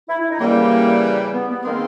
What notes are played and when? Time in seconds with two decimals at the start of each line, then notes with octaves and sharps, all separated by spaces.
0.09 E4
0.19 E4
0.29 D#4
0.40 C#3 E3 G3 A#3
1.33 B3
1.49 B3
1.64 D#3 G#3 A#3 C4